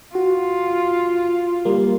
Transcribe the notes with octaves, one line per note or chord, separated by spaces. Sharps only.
F4 F#4
G3 A#3